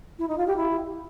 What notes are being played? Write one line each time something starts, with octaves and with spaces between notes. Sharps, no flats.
E4
D#4
F4
G4
E4